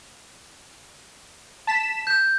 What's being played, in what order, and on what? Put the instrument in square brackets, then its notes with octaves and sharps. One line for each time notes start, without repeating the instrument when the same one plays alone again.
[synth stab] A5 B6 E7
[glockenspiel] G6